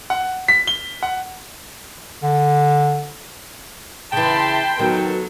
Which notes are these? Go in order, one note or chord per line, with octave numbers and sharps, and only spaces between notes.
F#5
B6
G7
F#5
D3
C#3 E3 G5 A5 B5 C6
D#3 F#3 B3 A4